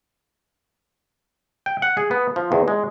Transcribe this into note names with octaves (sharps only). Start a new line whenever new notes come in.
G5
F#5
G#4
B3
F3
E2
G#3